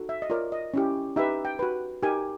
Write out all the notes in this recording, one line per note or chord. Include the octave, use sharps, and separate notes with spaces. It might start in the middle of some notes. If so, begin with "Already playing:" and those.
Already playing: D#4 F#4 A4
E5
D#5
F4 A#4 C#5 D5
D#5
C#4 E4 G4
D#4 G4 B4 E5
G5
F#4 B4
D#4 G4 A#4 G#5